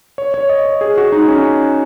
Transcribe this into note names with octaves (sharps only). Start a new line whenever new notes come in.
C#5
C#5
D#5
C#5
G#4
F#4
D#4
C#4